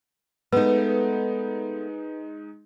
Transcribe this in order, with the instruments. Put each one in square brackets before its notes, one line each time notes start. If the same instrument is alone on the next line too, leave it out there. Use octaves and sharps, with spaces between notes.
[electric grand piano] G#3 D#4 [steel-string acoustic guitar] A3 B3 [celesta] B4